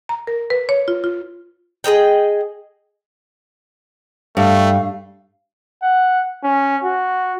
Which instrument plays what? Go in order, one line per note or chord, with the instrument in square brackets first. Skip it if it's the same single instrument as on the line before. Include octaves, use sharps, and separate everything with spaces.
[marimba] A#5
A#4
B4
C#5
F4
F4
[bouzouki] G#4 A#4 D#5 G5
[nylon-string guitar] G2 [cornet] A3 [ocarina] F5
[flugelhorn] F#5
C#4
F#4